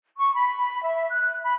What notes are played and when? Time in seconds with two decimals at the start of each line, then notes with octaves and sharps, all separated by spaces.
0.18 C#6
0.35 B5
0.83 E5
1.11 F#6
1.44 B5